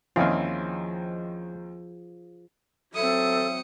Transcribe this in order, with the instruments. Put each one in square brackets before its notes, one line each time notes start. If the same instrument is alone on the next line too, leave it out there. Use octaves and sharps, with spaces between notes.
[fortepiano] D#2 D#3 C4 [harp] F3 G#4 [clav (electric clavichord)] C#4 E4 [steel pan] F4
[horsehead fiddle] F#3 C4 [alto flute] A4 [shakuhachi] E5 [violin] D#6 C#7